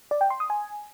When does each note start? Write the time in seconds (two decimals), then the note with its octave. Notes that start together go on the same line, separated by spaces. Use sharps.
0.11 D5
0.21 G5
0.30 C6
0.40 D#6
0.50 G#5